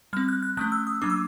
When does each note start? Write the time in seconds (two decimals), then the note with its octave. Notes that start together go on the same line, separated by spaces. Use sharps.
0.13 G3 C4 F6
0.28 F#6
0.42 F#6
0.57 F3 A3 C#4 F#6
0.72 E6
0.87 D#6
1.02 F#3 A#3 D4 D6
1.10 E6